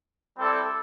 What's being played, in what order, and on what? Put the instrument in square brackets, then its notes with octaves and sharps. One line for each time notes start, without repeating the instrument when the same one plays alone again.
[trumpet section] G3 C4 E4 A4 D5